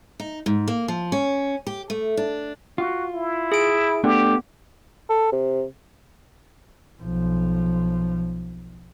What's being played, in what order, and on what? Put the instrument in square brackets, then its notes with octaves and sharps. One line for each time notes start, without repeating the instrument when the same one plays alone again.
[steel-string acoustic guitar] D#4
G#2
A#3
F3
C#4
G4
A3
D4
[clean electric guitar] F4 [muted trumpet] F#4
[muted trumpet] E4
[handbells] G#4 D7
[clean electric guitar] A3 D4 [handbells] B3 [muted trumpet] G4
[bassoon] A4
C3
[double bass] B1 F3